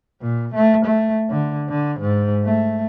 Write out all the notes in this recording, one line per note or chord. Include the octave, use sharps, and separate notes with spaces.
A#2
A3
A3
D3
D3
G#2
A3